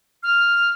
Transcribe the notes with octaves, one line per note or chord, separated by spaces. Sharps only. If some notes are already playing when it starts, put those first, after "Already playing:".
F6